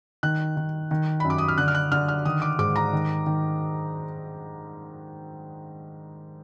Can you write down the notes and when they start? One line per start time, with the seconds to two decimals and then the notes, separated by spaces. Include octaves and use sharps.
0.23 D#3 F#6
0.57 D#3
0.91 D#3
1.20 F#2 B5
1.30 D6
1.38 D#6
1.48 F6
1.58 D3 F#6
1.68 F6
1.75 F#6
1.92 D3 F6
2.08 F6
2.25 D#3 D#6
2.42 D6
2.59 G#2 D6
2.76 A#5
2.93 D#3
3.26 D#3